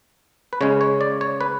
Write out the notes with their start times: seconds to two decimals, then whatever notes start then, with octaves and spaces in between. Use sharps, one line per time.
0.53 B4
0.61 C#3 G#3 C#4 C#5
0.81 C#5
1.01 D5
1.21 C#5
1.41 B4